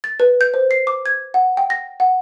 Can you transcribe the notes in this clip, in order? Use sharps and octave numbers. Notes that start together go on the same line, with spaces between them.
A6
B4
G6
C5
C7
D6
G#6
F#5
G5
A#6
F#5